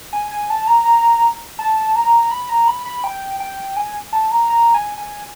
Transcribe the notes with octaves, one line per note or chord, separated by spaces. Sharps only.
G#5
G#5
A5
A#5
A#5
A5
A#5
B5
A#5
B5
B5
G5
G5
G#5
A5
A#5
A#5
G#5
G#5